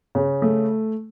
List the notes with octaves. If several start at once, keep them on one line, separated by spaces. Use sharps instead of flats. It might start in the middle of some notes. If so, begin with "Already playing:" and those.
C#3
A3